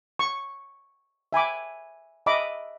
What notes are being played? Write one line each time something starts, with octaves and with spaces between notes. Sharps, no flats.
C#6
E5 G#5 B5 D6
D#5 E5 B5 D6